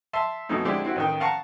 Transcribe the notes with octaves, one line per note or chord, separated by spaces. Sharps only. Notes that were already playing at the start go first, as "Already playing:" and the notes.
E5 A5 C6
F2 B2 E3 A3 D#4
D3 G#3 C4 D4 E4 G4
C4 E4 F#4
A1 D#3 G5
F5 F#5 A5 A#5 C#6